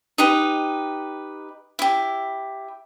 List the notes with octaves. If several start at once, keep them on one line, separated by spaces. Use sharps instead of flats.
D#4 G4 B4
E4 G4